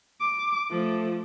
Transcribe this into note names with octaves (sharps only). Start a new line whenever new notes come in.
D6
F3 A3